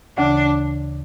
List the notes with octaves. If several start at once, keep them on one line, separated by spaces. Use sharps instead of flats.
D2 C#3 E3 D4